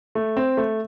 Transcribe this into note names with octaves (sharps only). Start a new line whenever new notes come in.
A3
C4
A3